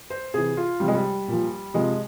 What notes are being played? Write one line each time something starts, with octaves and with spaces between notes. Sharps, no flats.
C5
C3 E3 G#4
F4
C3 F3 G3
G#3
G3
A#2 F3
C3 F3 G#3